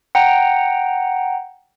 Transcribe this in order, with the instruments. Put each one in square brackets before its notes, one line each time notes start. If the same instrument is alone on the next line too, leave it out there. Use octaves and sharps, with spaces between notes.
[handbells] F#5 G5 A#5